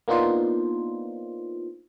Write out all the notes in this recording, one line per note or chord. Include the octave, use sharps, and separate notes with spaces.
A#3 B3 D4 D#4 F4 C5